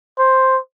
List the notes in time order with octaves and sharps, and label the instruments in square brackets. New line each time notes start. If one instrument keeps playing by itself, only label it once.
[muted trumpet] C5